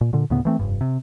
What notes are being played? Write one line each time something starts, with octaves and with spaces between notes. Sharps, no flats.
A#2
A#2 D3
D2 A2 C#3 B3
E3 A3 C4
F1 B1 G2
C3